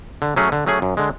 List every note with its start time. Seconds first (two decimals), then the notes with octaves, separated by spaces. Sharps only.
0.22 D3
0.36 F#3 A3 C#4 G#4
0.52 D3
0.66 F#3 A3 C#4 G#4
0.82 F#2
0.97 D3 G#3